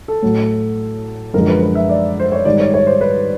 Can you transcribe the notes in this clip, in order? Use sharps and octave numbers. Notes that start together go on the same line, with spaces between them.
A4
A2 F#3 A3
F#2 D3 F3 G#3 A#4
B4
B4
E5
D5
C5
C#5
G#2 D#3 G3 D5
C#5
C#5
C5
B4